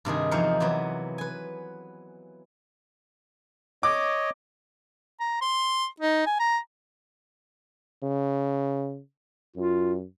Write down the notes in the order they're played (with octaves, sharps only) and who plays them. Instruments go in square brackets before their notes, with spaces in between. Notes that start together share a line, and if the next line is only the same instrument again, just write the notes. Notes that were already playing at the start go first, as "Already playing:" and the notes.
[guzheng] G2 C3 D#3 G#4
E2 F3 D#4 E4 F5 F#5
C3 E3 F#3 B3
B4 G#5
[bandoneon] C#5 D#5 [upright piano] D6
[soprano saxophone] A#5
C6
D#4
G#5
A#5
[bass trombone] C#3
[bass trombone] F#2 [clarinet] F4